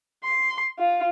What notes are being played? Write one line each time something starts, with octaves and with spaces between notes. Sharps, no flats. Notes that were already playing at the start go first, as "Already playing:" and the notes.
C6
F4